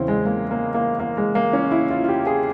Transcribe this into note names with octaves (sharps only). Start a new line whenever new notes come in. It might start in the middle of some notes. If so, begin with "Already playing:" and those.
Already playing: E2 C#3 E3 C4 C#4 E4
G#3
A#3
A#3
A#3
A#3
G#3
A#3
C#4
E4
F4
F4
G4
G#4